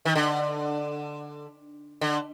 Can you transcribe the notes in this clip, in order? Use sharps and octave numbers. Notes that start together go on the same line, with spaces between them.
D#3
D3
D3